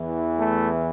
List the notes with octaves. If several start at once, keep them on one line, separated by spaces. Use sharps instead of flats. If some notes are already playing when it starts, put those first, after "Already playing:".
Already playing: E2 E3
A3